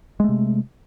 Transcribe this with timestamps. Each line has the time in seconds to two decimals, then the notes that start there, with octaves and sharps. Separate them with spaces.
0.20 G#3
0.24 A3
0.29 C3